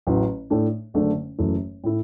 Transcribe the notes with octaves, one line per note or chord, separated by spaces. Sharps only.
A1 A2 F#3
A2 A3 D4
F#1 F#2 D3 A3 D4
F#1 F#2 E3 A3
A2 A3 E4